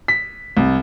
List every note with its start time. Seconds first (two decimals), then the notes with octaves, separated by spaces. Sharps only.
0.08 B6
0.57 C2